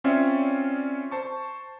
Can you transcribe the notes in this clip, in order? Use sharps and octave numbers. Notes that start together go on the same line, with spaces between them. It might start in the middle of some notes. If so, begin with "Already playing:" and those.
C4 C#4 F4 C#5 D5 E5
C5 A5 C#6